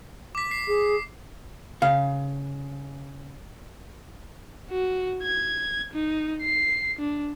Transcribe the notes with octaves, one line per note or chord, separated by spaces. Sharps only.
D6 B6
C7
G#4
C#3 F5
F#4
G#6
D#4
C7
D4